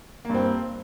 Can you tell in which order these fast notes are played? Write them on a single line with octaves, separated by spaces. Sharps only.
A#3 G2 C4